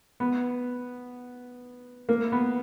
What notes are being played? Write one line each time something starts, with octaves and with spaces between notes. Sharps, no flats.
B3
A#3
B3